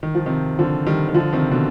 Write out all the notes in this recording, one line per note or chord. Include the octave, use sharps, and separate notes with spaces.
D#3
F3
C3 D#3
D3 F3
D#3 G3
D#3
D3 F3
C3 D#3
B2 D3